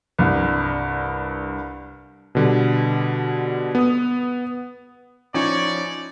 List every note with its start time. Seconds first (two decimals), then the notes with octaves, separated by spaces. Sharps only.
0.19 C2 G2
2.35 B2 D3 G3
3.75 B3 D#6
5.34 F3 C#4 D#4 E4 C#5 D5